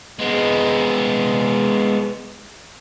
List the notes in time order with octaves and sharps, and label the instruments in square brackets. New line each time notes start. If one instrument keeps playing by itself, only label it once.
[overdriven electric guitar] G#3 B3